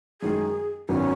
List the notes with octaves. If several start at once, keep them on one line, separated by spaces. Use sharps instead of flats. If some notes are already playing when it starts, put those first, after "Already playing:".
F#2 D#3 G#3 G#4
G#1 F#2 D#3 F#3 B3 C#4